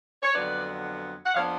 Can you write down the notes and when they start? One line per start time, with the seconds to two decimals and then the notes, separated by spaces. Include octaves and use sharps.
0.23 C#5
0.34 F2 D3 F#3 B3 D4 B4 D5
1.25 F#5
1.34 F2 F3 B3 D4 C#5 F5